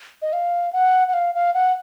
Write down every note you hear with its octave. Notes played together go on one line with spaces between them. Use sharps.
D#5
F5
F#5
F#5
F5
F5
F#5